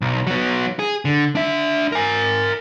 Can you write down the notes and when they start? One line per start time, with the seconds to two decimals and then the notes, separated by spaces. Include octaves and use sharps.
0.01 B1
0.27 F#3 B3
0.79 G#4
1.05 D3
1.35 D4 E5
1.92 A#4 G#5